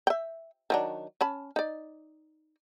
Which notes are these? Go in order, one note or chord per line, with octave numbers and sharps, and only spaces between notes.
E5 G5
D#3 F#3 D4
C#4 A5 B5
D#4 D5